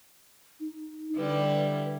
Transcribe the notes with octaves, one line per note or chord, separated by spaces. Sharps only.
D#4
D3 G3 E4 B4